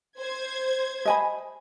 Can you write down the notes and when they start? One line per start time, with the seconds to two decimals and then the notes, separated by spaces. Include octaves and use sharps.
0.19 C5 G#6
1.05 D#5 G#5 B5